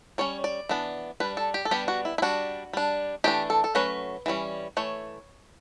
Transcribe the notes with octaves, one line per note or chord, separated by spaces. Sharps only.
G3 C#4 C#5
D5
E3 B3 D4
G3 D4 B4
A4
G4
A4
G3 B3 D4 G4
F#4
E4
E4
G3 D4 F#4
G3 D4
E3 A3 D4 G4
A4
A4
F#3 A3 C#4 B4
E3 G3 C#4
E3 A3 C#5